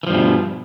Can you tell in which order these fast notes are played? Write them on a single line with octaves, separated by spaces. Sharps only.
E3 F3 G2 B2